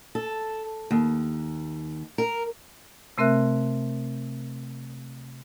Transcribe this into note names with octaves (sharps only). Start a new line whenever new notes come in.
A4
D#2
A#4
C3 A3 C4 A#4 E5 F#6